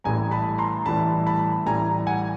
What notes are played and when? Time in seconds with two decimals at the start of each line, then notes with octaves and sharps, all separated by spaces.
0.04 A1 A2 E3 G3 G#5 A#5
0.31 A5 B5
0.58 A#5 C6
0.85 A1 A2 E3 G3 A5 B5
1.27 A5 B5
1.66 A1 A2 E3 G3 G#5 A#5
2.07 F#5 G#5